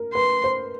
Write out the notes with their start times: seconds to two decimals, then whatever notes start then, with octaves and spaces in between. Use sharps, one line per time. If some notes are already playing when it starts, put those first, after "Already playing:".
Already playing: A#4
0.14 B4 C6
0.44 C5